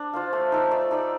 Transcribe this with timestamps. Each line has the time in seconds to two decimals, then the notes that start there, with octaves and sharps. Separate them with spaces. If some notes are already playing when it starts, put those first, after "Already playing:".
Already playing: D4
0.13 F4 C5 F5
0.33 A3
0.52 D#4 A4 D5
0.71 A3
0.91 D#4 A4 D5